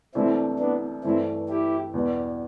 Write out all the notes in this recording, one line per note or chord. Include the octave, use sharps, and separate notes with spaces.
C2 C3 E3 A3 C4 D4 E4
B3 D4
G2 E3 A3 C4 E4
E4 G4
E2 B2 G3